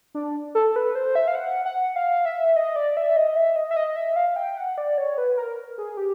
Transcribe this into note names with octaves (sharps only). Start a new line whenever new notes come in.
D4
A4
B4
C5
E5
F5
F#5
F#5
F5
E5
D#5
D5
E5
D#5
E5
D#5
E5
D#5
E5
F5
G5
F#5
D5
C#5
B4
A#4
G#4
G4